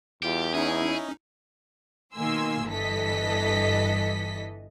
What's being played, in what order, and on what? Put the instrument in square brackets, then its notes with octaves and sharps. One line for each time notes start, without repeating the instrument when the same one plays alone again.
[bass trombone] E2 [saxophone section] G3 F4 [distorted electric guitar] G4
[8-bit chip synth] C#4 D#4 [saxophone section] E4 [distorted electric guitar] G#4
[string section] B2 D#3 A#3 G#5 C6 E6
G1 G2 E3 A4 D#5 B6